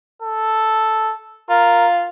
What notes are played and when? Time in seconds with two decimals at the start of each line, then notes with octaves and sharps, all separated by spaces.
0.22 A4
1.49 F4 A#4